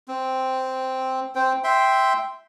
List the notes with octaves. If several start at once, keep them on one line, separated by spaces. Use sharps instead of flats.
C4
C4 C5 G5
E5 G5 C6